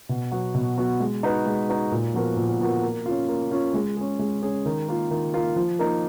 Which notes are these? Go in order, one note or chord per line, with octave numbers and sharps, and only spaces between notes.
B2
F#3 B3 F#4
B2
F#3 B3 F#4
G#3
D#4 F#4 B4
G#3
D#4 F#4 B4
A#2
F3 B3 F#4 A#4
A#2
F3 B3 F#4 A#4
A#3
C#4 F4
A#3
C#4 F4
G#3
C#4 G#4
G#3
C#4 G#4
D#3
A#3 F4
D#3
A#3 F4
F3
A#3 D#4 A#4